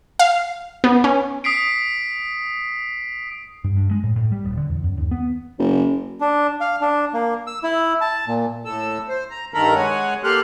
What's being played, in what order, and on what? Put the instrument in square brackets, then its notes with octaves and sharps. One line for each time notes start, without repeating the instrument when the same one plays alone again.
[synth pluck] F5
B3
C#4
[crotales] D#6 B6 C7 D7
[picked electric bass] G2
G2
G#3
A2
A2
G3
D#1
D3
E2
F#2
D#2
B3
[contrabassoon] F#1
[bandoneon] D4
F5
D4
A#3
E6
E4
A5
A#2
[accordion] A2 A4 E6
C5
A#5
G2 D#3 A4 A#4 A#5 B5
G#3 C#5 F#5 G#5
A#3 G4 A4 C6 F6 F#6